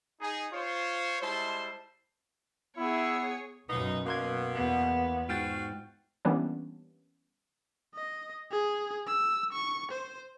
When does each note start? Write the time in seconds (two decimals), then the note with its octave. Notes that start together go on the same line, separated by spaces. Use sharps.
0.21 D#4 G#4
0.52 F4 C5 C#5
1.22 G3 G#3 E4 C5 A5 C6
2.77 B3 E4 G#4 C#5
3.70 B1 F#2 A#3 B3 D#4
4.06 B2 A#3 C6 G#6
4.55 E2 B3
5.29 G#2 F4 F#4 G5 A6
6.25 E3 G3 A#3 B3 C#4 D4
7.94 D#5
8.51 G#4
9.07 E6
9.52 C#6
9.92 C5